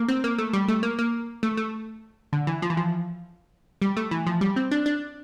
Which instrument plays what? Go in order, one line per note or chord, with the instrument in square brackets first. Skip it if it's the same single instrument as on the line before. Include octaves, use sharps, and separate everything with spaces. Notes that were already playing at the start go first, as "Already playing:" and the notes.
Already playing: [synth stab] A3 A#3
C4
A#3
A3
G3
A3
A#3
A#3
A3
A3
D3
E3
F3
E3
F3
G3
A3
E3
F3
G3
C4
D4
D4